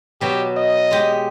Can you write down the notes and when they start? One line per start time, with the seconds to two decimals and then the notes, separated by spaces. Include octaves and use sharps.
0.21 B2 F#3 G4
0.57 D#5
0.91 G#3 G4